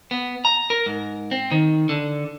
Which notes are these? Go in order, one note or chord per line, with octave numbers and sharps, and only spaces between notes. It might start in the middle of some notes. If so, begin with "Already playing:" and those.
B3
A#5
A#4
G#2
C4
D#3
D3